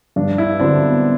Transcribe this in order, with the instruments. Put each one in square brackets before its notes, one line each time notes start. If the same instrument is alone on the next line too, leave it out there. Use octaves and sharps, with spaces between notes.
[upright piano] G2 [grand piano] D4
[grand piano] E4
[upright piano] D3 F#3 C4 E4 [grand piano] D4
[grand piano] B3